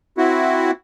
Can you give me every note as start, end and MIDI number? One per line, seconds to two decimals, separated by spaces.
0.18 0.71 60
0.18 0.71 64
0.18 0.71 66